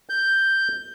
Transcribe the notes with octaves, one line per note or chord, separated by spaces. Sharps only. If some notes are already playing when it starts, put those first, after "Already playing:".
G6